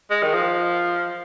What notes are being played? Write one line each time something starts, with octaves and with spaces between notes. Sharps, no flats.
G#3
D#3
F3